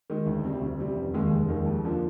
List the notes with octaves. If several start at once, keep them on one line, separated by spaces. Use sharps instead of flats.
D#3 G#3
D2
C3 G3 C4
D2
C3 G3 C4
F1
D#2 D#3 G#3
F1
D#2 D#3 G#3
F2
D3 F3 A#3 F4